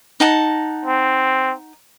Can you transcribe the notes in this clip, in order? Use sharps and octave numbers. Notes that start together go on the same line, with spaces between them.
D#4 F#5 A5
C4